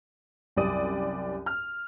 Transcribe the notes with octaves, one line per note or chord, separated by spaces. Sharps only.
C2 F#2 G4 D5 D#6 D#7
F6